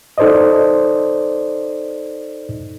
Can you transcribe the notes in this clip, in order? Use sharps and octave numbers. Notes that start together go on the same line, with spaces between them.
D#4 A4 C5 D5 D#5